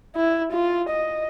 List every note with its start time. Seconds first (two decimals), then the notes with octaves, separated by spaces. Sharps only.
0.16 E4
0.52 F4
0.89 D#5